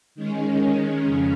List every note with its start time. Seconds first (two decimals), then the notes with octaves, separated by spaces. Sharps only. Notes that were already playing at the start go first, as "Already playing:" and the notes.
0.15 D#3 G#3 C#4
1.05 F2 C#3 C#4